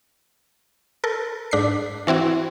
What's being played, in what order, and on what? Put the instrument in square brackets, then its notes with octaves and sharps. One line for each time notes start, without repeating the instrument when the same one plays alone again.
[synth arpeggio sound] A4 A#4
G#2 D4 B6 C7
E3 C4 E4 F#4